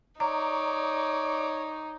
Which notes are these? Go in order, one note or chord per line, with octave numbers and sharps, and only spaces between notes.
D#4 C#5 D5 A#5